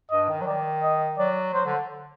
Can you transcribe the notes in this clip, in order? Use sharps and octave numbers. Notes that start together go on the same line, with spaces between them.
G2 D#5
D#3
F#3
D#3 D5
D#5
F#3 D5
F#3 C5
D3